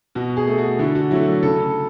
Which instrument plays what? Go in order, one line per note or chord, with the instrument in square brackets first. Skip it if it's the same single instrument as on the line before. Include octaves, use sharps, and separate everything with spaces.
[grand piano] B2 F#4
G#4
A3
F#4
D3 E4
F#4
F#3 A3 E4
C#3 A4